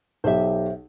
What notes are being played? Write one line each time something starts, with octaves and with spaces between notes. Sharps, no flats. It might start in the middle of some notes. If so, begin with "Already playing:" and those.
B1 G4 C5 E5